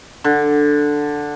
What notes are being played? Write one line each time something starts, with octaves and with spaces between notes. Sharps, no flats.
D3